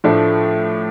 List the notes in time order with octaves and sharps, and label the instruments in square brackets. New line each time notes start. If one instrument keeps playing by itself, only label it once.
[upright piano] A2 F3 A3 D4